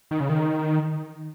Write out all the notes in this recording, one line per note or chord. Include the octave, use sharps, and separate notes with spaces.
D#3
C#3
D#3